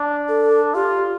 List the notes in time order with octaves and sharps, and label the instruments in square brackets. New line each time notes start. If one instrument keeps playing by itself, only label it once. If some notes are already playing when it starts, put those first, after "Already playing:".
Already playing: [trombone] D4
[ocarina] A4
[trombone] F4 [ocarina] G4